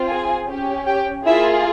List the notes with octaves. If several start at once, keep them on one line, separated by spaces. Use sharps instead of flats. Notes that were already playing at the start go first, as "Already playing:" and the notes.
Already playing: C4 F4
G#4 G#5
C#4 G4
G4 G5
A#3 E4 F4 G#4 E5